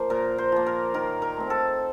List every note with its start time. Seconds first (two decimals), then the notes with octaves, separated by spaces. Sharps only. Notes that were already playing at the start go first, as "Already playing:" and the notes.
Already playing: F3 A#3 C5
0.10 A#2 A#4
0.38 C5
0.52 F3 A#3
0.66 A#4
0.94 D#3 A#4
1.22 A#4
1.37 A3 C4
1.50 A4